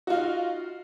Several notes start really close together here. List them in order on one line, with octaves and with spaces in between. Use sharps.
F#4 F4 D#4